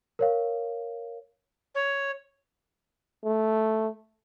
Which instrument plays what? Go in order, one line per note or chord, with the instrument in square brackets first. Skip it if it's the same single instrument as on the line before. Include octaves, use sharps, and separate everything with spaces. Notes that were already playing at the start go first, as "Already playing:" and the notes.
[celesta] A#4 C#5 F5
[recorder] C#5
[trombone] A3